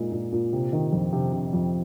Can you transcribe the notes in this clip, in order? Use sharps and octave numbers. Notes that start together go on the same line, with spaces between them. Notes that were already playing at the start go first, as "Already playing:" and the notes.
Already playing: A#2 G#3 D#4
A#2
A#2
C3
D#3
F2
C3
C3
F2